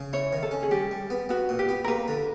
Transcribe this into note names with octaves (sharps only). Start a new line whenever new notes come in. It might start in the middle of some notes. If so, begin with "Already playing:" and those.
Already playing: C#3
E4 C#5
D#3
A4
C#4
G#4
G3 G4
G3
B3
B3 F#4
A#2
G4
B3
A#4
A#3 B4
D3